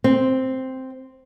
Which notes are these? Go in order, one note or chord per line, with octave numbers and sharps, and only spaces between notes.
C4